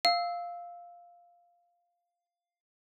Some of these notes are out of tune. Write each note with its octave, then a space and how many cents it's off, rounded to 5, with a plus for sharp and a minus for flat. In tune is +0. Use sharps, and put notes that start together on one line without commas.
F5 +0 E6 -15